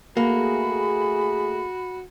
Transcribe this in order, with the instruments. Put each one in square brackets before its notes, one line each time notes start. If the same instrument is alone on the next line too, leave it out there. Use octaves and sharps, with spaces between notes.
[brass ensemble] A3 G#4 [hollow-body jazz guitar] A#3 [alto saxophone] F#4 [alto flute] B5